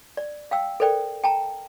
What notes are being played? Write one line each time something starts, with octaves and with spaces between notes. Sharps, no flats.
D5
F5 G5 E6
A4 A#4 C5 D5 G5
G5 A5 A#5